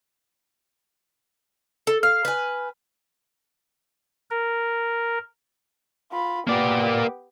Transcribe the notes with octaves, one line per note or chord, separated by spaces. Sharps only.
A4
F5 F6
B4 G#5
A#4
F4 B5
A#3 B3 G4 D5